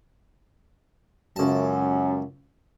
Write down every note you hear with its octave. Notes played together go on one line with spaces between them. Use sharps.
C#2 F#2 A5